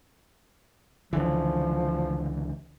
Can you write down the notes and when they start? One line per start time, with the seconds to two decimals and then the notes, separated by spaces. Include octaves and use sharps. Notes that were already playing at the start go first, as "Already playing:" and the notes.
1.13 C#2 D3 E3 F3